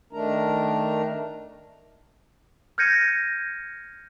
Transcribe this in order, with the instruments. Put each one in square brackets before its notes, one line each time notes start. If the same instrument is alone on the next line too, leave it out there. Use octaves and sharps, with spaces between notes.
[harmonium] D#3 A3 D4 A#4 A#5
[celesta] F6 G6 G#6 A#6 C#7 D#7